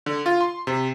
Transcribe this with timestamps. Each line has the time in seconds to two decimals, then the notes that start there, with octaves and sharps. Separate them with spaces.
0.06 D3
0.26 F4
0.41 C6
0.67 C3